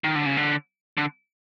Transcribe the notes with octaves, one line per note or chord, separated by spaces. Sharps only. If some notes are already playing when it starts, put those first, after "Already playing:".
D#3
D3
C#3
D3
D3